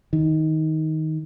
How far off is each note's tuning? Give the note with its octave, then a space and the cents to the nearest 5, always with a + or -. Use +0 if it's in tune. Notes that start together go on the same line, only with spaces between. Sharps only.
D#3 +15